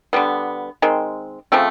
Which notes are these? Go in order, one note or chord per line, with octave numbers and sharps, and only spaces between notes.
D3 G3 B3
D#3 G#3 C4
C#3 F3 A3 C4